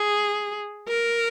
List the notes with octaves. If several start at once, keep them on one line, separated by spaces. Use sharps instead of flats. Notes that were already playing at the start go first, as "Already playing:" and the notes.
Already playing: G#4
A#4